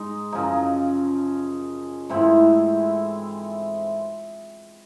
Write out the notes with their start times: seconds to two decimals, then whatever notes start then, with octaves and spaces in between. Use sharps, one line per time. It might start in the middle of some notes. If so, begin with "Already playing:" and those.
Already playing: G#2 G#3 D#4
0.32 F#2 C#3 F3 D#4
2.09 G#2 E3 A3 C4 E4